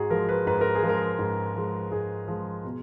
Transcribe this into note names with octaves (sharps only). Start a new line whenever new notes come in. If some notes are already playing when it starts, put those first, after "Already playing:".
Already playing: G#2 F#4 G#4
F3 G#3 A#4
B4
G#2 B4
A#4
G#4
F3 G#3
A#4
G#2
F3 G#3
G#2 G#4
F3 G#3
B2